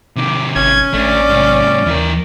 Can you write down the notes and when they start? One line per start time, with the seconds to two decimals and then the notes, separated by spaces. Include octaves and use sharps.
0.16 C3 D#3 D6
0.55 G#1 C#4 G#6
0.94 A1 A3 D4 D5
1.30 G#2 C3
1.86 D#2 E3 A#4